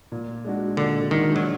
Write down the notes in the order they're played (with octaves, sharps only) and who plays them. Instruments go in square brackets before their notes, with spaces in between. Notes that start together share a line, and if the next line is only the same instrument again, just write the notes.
[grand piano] A#2
G#3 D4 F#4
[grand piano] A#2 [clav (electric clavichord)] D3
[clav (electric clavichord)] D#3 [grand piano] G#3 D4 F#4
[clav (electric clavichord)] F#3